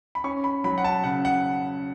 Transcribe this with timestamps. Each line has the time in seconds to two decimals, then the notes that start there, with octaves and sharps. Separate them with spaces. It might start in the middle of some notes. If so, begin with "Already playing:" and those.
0.15 B5
0.24 C#4 C#6
0.44 B5
0.64 F#3 B5
0.78 F#5
0.85 A5
1.04 C#3 F#5
1.25 F#5